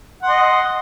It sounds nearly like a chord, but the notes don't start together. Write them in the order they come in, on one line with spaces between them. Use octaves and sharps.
F#5 C6 D#5